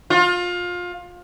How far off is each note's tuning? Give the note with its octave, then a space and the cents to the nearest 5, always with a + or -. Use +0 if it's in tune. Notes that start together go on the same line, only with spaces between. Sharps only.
F4 +25